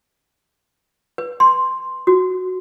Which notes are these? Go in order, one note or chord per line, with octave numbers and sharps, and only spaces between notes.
B4
C6
F#4